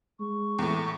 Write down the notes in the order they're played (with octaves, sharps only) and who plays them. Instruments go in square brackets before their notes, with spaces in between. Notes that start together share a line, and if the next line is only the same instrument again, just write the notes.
[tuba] G#3 [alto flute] C#6
[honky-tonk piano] E2 A2